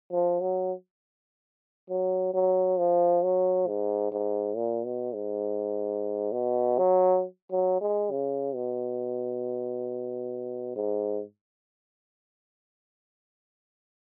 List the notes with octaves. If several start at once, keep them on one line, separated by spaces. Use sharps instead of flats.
F3
F#3
F#3
F#3
F3
F#3
G#2
G#2
A#2
B2
G#2
B2
F#3
F#3
G#3
C#3
B2
G#2